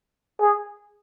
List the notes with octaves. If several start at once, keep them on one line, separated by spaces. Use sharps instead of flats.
G#4